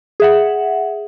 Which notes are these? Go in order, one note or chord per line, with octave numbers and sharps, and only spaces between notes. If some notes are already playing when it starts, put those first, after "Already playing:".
G#4 E5 F#5